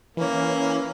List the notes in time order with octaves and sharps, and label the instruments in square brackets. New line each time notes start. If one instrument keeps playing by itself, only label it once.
[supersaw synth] E3 C#4 [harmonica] A#3